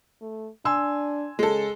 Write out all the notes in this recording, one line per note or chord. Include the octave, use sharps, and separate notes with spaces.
A3
D4 G#5 C6 E6
C#3 G#3 A4